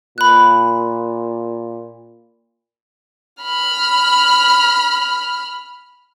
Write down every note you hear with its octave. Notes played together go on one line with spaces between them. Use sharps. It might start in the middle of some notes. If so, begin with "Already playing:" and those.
A#2 B5 F#6
B5 F6